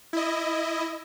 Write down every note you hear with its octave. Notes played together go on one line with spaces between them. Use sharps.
E4 D#5